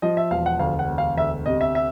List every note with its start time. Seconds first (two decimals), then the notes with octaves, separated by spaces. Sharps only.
0.02 F3 D#5
0.17 E5
0.31 E1 F5
0.46 F#5
0.59 D2 F5
0.79 F#5
0.89 E1
0.98 F5
1.17 D2 E5
1.46 C3 D#5
1.61 E5
1.75 E5